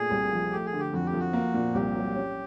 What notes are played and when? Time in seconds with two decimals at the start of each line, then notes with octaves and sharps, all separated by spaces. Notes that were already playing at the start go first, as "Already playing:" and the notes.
Already playing: A#2 A3 G#4
0.11 C2
0.31 F3
0.52 A3 G4
0.66 G#4
0.73 D3
0.80 G4
0.93 F2 F#4
1.06 G4
1.13 F3
1.20 F#4
1.33 A#3
1.54 A#2
1.74 C2 G4
1.96 F#3
2.15 C#4